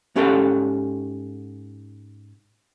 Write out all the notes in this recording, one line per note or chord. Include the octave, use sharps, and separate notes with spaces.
G#2 C#4 G4 A4 F5 A5